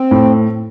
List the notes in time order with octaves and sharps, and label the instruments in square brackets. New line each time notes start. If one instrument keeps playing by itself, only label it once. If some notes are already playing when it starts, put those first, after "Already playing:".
Already playing: [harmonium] C4
[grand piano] A2